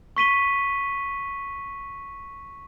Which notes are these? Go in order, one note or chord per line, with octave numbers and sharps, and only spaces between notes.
C#6 B6 D#7 G7